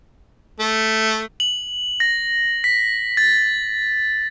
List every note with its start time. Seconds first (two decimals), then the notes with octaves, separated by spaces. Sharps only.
0.60 A3
1.40 F#7
2.00 A#6
2.64 B6
3.17 A6